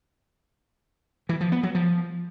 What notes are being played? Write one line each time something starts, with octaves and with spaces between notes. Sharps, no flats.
E3
F3
B3
F#3
F3